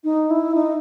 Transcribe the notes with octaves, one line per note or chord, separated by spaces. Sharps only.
D#4
E4
D#4